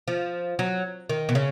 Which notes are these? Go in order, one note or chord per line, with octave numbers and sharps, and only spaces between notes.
F3
F#3
D#3
B2
C#3